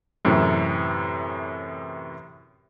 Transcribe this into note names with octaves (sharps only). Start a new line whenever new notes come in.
F#2 A2 C3 E3